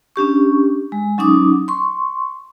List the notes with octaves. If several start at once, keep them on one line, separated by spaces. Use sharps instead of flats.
C#4 D4 G4 C#6
G#3
F#3 C#4 D#4 D6 D#6
C6 C#6